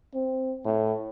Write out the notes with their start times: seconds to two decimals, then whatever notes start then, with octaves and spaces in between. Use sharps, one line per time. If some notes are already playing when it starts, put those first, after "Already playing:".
0.14 C4
0.65 A2